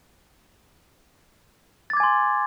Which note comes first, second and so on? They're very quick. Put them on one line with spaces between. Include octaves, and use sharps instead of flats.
A6 D6 G#6 G#5 C6